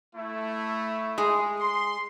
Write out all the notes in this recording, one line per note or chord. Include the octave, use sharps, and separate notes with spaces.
A3 E4
G#3 G#4
C6